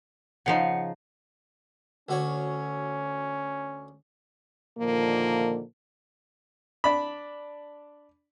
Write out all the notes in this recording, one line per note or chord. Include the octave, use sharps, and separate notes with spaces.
C#3 F3 D#4 F#5 C#7
D2 C#4 F#4 C#5
A#2 D3 D#3 F3 A#3
D4 B5